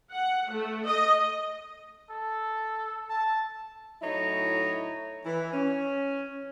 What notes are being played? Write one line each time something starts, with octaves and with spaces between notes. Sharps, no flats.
F#5
A3
D#5
A4
A5
A2 F#3 D#4 E4 C#5
E3
C#4